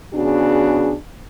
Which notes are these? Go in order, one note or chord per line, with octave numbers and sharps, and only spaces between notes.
C#3 B3 D4 F#4 G#4